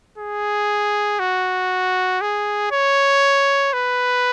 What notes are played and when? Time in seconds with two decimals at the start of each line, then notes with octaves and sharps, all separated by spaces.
0.18 G#4
1.19 F#4
2.21 G#4
2.72 C#5
3.73 B4